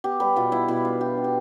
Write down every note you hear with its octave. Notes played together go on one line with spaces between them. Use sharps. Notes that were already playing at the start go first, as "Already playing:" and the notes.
B3 G4
G3 B4
B2 F4
B3 E4
B2 E4
D4 F4
D4 G4
D4
G4